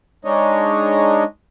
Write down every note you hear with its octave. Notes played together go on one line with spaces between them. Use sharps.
G#3 D4 D#4 C#5 D#5